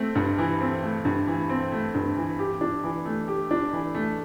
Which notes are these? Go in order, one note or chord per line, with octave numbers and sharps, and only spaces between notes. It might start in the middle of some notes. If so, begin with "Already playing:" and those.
Already playing: A3 C4
G2
E3
C4
A3
G2
E3
C4
A3
G2
E3
G4
D4
E3
A3
G4
D4
E3
A3